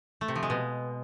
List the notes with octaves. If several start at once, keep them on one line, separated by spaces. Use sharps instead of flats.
A3
C3
F3
G#3
B2